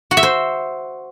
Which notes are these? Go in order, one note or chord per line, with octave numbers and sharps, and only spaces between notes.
F#4
E5
C5